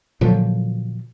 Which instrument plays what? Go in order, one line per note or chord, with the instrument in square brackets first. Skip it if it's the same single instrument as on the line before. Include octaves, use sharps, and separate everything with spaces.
[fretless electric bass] A#2 D3 F3 F#3